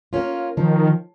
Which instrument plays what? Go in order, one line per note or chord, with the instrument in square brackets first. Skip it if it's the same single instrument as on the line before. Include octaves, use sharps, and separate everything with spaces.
[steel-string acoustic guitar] A#3 C#4 F4
[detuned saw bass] D#3 [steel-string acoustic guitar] F3